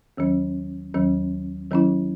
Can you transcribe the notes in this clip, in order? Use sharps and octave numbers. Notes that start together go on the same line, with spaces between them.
D#2 D#3 F#3 C#4
D#2 D#3 F#3 C#4
D#3 F#3 C#4 E4